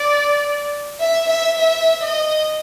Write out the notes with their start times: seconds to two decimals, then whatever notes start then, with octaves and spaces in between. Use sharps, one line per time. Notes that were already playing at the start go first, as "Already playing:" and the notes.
Already playing: D5
1.00 E5
1.30 E5
1.59 E5
2.03 D#5